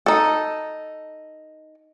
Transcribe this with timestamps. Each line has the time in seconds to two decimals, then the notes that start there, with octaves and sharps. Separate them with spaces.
0.06 D#4 A4